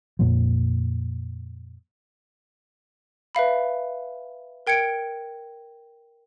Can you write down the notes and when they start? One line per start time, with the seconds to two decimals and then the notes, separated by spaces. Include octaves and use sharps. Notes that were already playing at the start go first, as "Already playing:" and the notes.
0.19 F2 A#2 F3
3.35 B4 E5 F5 B5
4.67 A#4 G5 G#6 C#7 D7